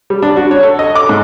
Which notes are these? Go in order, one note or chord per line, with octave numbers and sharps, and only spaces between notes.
G3
D4
F#4
C#5
A4
D#5
D6
G#2